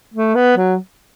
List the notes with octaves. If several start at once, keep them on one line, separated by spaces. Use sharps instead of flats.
A3
B3
F#3